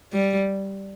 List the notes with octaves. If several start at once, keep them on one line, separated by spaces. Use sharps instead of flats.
G3